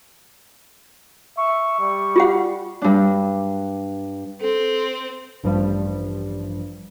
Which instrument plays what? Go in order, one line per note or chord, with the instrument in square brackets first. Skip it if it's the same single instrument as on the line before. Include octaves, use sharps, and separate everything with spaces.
[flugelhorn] E5 [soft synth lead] C#6
[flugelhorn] G3
[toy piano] F4 G4 F#5
[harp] G2 D4
[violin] C4 [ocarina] A4
[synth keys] A1 G2 F3 G3